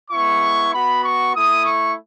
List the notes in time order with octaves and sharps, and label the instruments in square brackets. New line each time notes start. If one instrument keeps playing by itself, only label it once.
[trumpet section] G#3 B3 E4 C#6
B3 F#4 B5
C#6
A3 E4 D#6
C#6